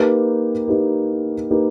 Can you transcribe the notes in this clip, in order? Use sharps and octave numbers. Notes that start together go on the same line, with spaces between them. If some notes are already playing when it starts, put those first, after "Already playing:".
Already playing: A#3 D#4 G4 B4
A#3 D#4 G4 B4
A#3 D#4 G4 B4